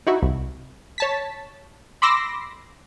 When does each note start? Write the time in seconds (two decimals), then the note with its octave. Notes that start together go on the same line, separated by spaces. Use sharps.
0.07 D#4 E4 F#4
0.23 C2
0.98 C#5 A5 B6
2.02 B5 C6 D6 E6 A#6 C7